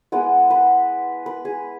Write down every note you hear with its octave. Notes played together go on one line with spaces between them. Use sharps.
G#3 B3 E4 B4
B4
B4
G#4